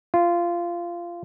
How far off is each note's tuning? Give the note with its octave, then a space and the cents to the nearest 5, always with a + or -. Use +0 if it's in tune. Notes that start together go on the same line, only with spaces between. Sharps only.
F4 -15